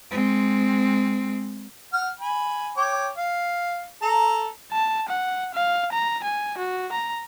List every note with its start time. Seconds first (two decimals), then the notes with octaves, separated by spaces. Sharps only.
0.11 G#3 C4
1.93 F#5 F6
2.20 G#5 B5
2.77 C#5 G5 D6
3.18 F5
4.02 A4 A#5
4.72 A5
5.09 F#5
5.55 F5
5.92 A#5
6.24 G#5
6.58 F#4
6.92 A#5